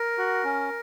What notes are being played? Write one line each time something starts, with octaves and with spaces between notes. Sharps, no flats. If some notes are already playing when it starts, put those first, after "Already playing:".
Already playing: A#4
F#4
C#4